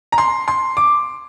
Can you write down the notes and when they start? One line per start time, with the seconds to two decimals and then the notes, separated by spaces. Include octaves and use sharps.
0.12 A#5
0.18 C6
0.48 C6
0.77 D6